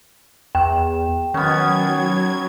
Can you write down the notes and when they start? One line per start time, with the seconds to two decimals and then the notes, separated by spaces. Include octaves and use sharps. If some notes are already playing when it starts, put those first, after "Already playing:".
0.55 E2 G5
1.34 D#3 F#3 B3 C#4 G#6